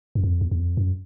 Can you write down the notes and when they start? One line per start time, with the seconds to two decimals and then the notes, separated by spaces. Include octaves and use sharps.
0.15 F#2
0.24 F2
0.41 E2
0.51 E2
0.60 F2
0.77 F#2